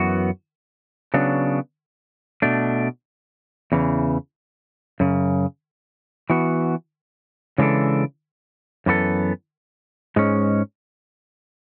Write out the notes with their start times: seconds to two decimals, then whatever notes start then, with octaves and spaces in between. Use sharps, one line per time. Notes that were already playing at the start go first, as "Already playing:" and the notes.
Already playing: F#2 E3 B3 F#4
1.14 C#3 F#3 B3 D4
2.42 B2 A3 D4
3.72 E2 C#3 E3
5.00 F#2 C#3
6.30 E3 B3 F#4
7.58 C#3 E3 G#3 D4 A4
8.86 F#2 E3 B3 F#4 A4
10.16 G#2 G#3 C#4